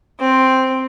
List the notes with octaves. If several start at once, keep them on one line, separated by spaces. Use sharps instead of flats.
C4